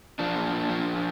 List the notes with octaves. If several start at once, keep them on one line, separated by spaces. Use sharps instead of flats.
F3 D4
A#2
A#2
F3